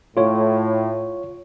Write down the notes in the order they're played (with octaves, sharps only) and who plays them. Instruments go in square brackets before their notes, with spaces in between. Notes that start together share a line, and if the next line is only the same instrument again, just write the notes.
[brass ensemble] A2 [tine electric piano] F4 C#5